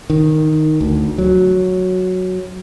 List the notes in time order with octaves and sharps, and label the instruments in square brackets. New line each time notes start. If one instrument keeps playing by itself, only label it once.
[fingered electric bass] D#3
D2
F#3